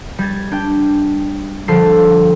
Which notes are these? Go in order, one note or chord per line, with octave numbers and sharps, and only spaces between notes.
G3 G#6 A6
D4 G5 G6
D3 F3 G3 A4 C7